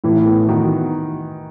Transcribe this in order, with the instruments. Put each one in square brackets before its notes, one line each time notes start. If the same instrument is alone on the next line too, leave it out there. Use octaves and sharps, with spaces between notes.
[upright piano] A2 [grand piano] E3
[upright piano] B3
[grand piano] D#3 [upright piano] F#4